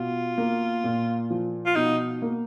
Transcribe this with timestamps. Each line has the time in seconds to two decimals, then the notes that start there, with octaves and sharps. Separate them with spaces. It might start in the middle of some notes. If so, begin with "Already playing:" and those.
Already playing: B2 F4
0.38 A#3
0.84 A#2
1.30 F3
1.66 F4
1.76 B2 D#4
2.22 A#3